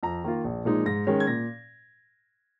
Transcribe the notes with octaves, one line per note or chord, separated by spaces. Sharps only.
F2 A#5
D#3 A#3 F4
A#1
A#2 F3 G#3 D#4
G#2 A#6
D#3 G#3 C#4
G#6
A#2 A#6